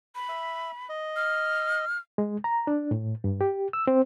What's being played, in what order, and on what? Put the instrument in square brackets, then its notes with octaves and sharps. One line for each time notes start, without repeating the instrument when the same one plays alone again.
[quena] B5
[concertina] E5
D#5
[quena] F6
[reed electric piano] G#3
A#5
D4
A2
G2
G4
E6
C4